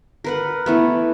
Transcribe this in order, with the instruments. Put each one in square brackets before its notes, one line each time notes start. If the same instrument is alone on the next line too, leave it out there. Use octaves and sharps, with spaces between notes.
[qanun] A#4 B4 F#5
E3 A3 B3